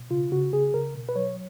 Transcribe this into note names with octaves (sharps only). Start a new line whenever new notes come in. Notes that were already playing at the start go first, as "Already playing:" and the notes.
Already playing: B2
C#3 F4
C#3 F#4
C#3 G#4
C#3 A#4
B2
B4
F#3 C#5